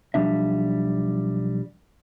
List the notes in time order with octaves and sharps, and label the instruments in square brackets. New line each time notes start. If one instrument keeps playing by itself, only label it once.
[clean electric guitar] B1 C3 F3 G3 D4 E5